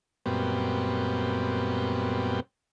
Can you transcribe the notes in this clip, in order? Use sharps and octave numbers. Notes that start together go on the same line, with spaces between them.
F#2 A#2 G3 B3 C4